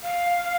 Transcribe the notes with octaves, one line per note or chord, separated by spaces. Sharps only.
F5